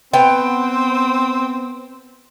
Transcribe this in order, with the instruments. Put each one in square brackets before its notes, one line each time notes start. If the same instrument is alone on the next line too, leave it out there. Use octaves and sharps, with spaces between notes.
[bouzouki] B3 G5 [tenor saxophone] C4